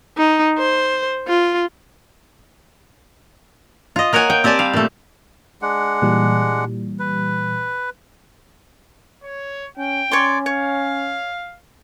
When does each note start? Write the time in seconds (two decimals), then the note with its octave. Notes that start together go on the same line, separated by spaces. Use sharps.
0.17 D#4
0.57 C5
1.27 F4
3.96 F4 D#5
4.13 A#3 A#4 C#5 F#5 G#5
4.30 G5
4.44 C4 G4 D5 G#5 A5
4.59 G3 F5
4.73 A#2 A3
5.62 G#3 D4 F#5
6.02 A#2 E3 G3
6.99 B4
9.23 C#5
9.77 C#4 G5
10.11 C#4 C#5 D5 C6
10.46 C#5 F5